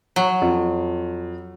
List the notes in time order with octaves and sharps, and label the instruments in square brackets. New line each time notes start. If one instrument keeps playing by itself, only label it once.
[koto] F#3
[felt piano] F2